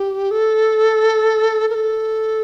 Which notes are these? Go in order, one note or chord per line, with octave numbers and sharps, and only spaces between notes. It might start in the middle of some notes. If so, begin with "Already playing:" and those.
Already playing: G4
A4
A#4
A4